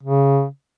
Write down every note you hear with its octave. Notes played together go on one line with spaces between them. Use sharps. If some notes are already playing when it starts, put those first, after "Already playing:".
C#3